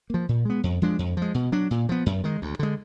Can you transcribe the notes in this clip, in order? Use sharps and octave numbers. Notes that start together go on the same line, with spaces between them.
F3 A#3
A#2
G#3 B3
F2
F3 G#3 D4
F2
F3 G#3
B2
F#3 D4
A#2
F3 B3
F#2
D#3 G#3
D2
D3 G#3